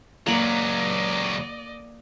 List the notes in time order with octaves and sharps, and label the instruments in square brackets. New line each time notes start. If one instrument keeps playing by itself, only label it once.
[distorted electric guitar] C#2 F#3 [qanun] A#3 B5 [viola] D5 D#5